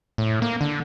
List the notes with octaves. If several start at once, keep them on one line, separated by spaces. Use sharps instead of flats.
A2
A#3
D3